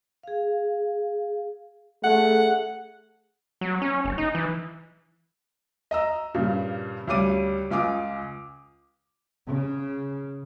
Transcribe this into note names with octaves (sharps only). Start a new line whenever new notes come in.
G#4 F5
A3 G#4 F#5
F#3
C#4
F#1
D#4
E3
D#5 A#5 E6
G2 A#2 C#3
D2 C#3 G3 C#4 D6 D#7
C#2 F4 G#5 D6 D#6
C#3